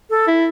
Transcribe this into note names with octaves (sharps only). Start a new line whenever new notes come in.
A4
E4